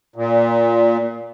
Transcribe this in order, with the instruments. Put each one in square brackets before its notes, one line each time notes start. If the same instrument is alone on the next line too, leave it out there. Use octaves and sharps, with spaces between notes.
[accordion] A#2